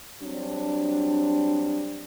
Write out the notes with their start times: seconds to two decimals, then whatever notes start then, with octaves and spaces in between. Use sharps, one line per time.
0.23 F#3 G3 C4 D4